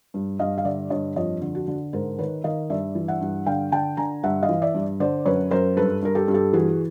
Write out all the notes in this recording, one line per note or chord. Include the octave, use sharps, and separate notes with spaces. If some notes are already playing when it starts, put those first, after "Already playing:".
G2
G2 D#5 F5
F5
D3 D5 E5
G2 C#5 D#5
F2 C#5 D#5
D3
F#4
D3
G#2 A#4 C5
D#3 B4 C#5
D#3 D#5 F5
G2 D5 E5
E3
E5 F#5
G2
D3 F5 G5
D3 G5 A5
D3 G#5 A#5
G2 E5 F#5
D#5 F5
E3
D5 E5
G2
D3 C5 D5
F#2 B4 C#5
F#2 A#4 C5
G2 A4 B4
G2 A#4
G4 A4
G2
G4 A4
E3 F#4 G#4